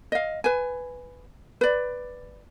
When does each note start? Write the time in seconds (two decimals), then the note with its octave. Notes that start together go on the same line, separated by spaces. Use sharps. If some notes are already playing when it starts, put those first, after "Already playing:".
0.12 D#5 F5
0.44 B4 G#5
1.61 B4 D5